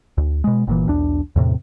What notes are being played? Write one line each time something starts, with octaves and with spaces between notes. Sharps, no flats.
D2
B2 G#3
G1 A#2 E3
B1 E2 D4
E2 A2 C3